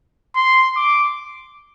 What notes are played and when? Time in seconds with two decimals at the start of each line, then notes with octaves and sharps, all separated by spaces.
0.35 C6
0.76 D6